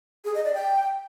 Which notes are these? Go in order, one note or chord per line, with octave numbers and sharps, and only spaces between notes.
G#4
D#5
D5
G5